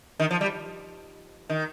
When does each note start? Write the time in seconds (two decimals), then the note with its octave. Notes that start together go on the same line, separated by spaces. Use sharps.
0.20 D#3
0.31 F3
0.41 G3
1.50 D#3